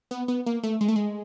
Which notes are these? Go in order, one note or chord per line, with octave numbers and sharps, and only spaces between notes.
B3
B3
A#3
A3
G#3
A3
G#3